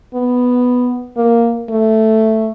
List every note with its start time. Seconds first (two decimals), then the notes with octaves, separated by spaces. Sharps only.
0.14 B3
1.16 A#3
1.69 A3